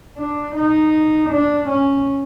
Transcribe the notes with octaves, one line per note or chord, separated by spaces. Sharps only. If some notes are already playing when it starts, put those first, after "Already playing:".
D4
D#4
D4
C#4